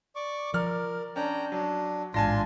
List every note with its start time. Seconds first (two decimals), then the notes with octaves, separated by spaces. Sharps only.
0.16 D5 C#6 D6
0.54 F3 A#4 D5 F6
1.16 C#4 D4 G5 A#5
1.52 F#3 D4
2.14 A1 G#2 D4 F4 G#5 A5 C6 A#6